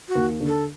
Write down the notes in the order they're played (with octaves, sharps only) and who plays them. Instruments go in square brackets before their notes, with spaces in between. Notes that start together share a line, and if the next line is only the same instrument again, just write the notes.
[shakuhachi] F#4
[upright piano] D#2
D3
[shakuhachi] A4